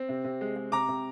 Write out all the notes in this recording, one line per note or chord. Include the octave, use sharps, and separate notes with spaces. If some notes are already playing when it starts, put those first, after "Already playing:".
Already playing: C4
C3
C3
G#3
G#3
C3 A#5 D6
C3